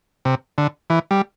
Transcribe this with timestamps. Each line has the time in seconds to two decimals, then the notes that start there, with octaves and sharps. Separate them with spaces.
0.25 C3
0.58 D3
0.90 E3
1.11 G3